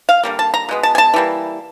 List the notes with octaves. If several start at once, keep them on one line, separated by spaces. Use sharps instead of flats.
F5
D3 G3 A#3
A5
A#5
B2 G#3 B3
A5
G#5
A5
E3 G3 A#3